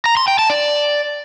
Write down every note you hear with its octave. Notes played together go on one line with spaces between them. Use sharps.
A#5
C6
G5
A5
D5